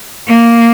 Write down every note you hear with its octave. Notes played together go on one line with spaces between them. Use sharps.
A#3